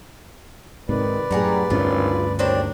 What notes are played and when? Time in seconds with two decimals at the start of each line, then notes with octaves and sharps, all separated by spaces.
0.89 G#2 C3 D#3 B4 D5
1.31 F#2 A2 G3 G#4 F#5 A#5
1.70 G#1 D2 G2 C#4 F4
2.39 D#2 F#3 C4 D4